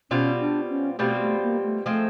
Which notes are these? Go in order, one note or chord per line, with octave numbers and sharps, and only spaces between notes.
B2 G3 C4 C#4 F4
D4
C#4
B2 G3 A3 C4 F4
A3
A#3
A3
F3 G#3 A3 C4